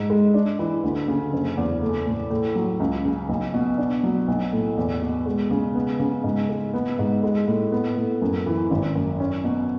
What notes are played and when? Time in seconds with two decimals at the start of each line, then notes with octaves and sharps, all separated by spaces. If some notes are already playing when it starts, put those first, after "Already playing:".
Already playing: G#2
0.10 G#3
0.34 D4
0.59 E3
0.83 D2
1.08 C#3
1.33 F#1
1.57 E2
1.82 A3
2.06 A2
2.30 A2
2.56 F#3
2.80 C#2
3.05 C#3
3.29 B1
3.54 B2
3.78 D4
4.03 F#3
4.28 B1
4.53 A2
4.77 E2
5.02 B2
5.26 G#3
5.51 C#3
5.75 B3
6.00 C#3
6.24 G#2
6.49 G#3
6.73 B3
6.99 G#2
7.24 G#3
7.47 A2
7.72 B3
7.97 A2
8.22 F#2
8.46 E3
8.71 G#1
8.95 F#2
9.20 C#4
9.44 B2